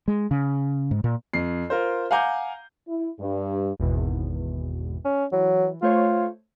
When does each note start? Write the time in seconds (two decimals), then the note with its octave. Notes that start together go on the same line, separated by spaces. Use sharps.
0.08 G#3
0.31 C#3
0.91 G#2
1.04 A#2
1.33 F2 C7
1.70 F4 A#4 C5
2.11 F5 F#5 G#5 A#5 D6 G6
2.87 E4
3.19 G2
3.79 G#1 E2 B2
5.05 C#4
5.32 E3 F#3
5.82 A3 F4 C5 C#5